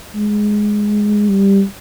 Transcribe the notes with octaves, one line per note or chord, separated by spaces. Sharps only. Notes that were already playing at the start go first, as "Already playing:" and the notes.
G#3
G3